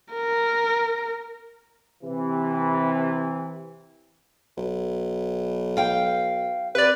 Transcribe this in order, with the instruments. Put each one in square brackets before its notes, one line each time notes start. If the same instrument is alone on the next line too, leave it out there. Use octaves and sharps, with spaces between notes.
[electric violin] A#4
[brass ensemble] C3 E3
[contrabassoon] B1
[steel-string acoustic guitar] F5 G5
[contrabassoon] C3 [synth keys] B4 D5